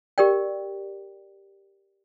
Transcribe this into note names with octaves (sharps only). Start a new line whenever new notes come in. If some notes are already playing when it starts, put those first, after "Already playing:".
G4 A#4 D5 G5